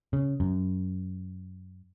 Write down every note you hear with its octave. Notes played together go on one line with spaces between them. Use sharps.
C#3
F#2